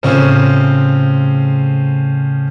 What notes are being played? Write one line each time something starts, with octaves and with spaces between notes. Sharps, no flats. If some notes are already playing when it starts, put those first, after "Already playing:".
A2 C#3 F3 C4 C#4 E7